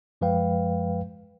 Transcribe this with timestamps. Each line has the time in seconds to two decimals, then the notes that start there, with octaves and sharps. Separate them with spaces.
0.21 F#2 F3 G#3 B4 F5 G5